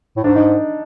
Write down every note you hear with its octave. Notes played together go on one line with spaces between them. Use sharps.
A2
G#2 D4
D#4